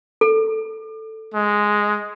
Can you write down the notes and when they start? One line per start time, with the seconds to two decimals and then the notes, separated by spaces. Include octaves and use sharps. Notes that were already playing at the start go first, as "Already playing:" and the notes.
0.21 A4
1.34 G#3